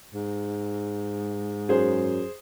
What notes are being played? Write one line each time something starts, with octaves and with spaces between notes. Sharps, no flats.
G#2
F#2 G#4 C5